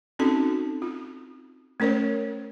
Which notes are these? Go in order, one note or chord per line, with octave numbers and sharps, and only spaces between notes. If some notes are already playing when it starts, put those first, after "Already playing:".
C4 C#4 D#4 F#4 A4 A5
F4
A3 C#4 A#4 C5 C#5